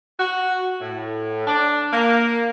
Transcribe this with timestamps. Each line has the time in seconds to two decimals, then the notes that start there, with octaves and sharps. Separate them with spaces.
0.19 F#4
0.81 A2
1.47 D4
1.93 A#3